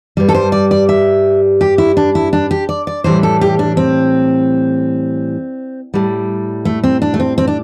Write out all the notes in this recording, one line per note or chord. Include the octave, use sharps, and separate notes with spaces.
G2 G3
A4
C5
D5
D5
E5
G4
E4
D4
E4
D4
G4
D5
D5
A2 E3 G3 C5
A4
G4
D4
C4
A2 G3
A3
C4
D4
A3
C4
C4
D4